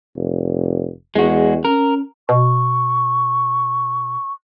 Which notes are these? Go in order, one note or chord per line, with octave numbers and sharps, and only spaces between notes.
F1
E2 G#3 F#4
C#4 A#4
B2 C#6